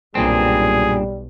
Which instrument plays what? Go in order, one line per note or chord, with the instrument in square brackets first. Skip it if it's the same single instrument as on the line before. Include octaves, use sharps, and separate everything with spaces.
[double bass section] B1 [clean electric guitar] G2 A#2 C4 [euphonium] G3 [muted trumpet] G#4